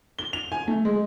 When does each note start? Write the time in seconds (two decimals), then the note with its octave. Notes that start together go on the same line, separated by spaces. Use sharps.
0.19 G7
0.33 F7
0.52 G#5
0.68 A3
0.85 G#3